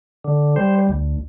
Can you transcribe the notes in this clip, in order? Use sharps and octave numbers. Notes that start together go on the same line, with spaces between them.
D3
G3 C5
D2